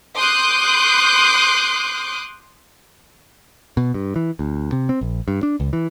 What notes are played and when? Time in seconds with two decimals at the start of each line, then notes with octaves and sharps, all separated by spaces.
0.18 C6 D6 D#6 F#6 G6 C7
3.77 B2
3.94 G2
4.16 E3
4.39 D2
4.72 C3
4.89 C4
5.01 A#1
5.28 G2
5.43 D4
5.60 C#2
5.73 E3